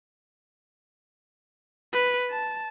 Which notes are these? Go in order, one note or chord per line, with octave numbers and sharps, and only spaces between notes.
B4
A5